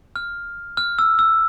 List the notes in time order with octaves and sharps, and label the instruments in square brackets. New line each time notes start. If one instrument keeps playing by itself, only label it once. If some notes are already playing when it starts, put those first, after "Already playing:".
[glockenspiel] F6
F6
E6
E6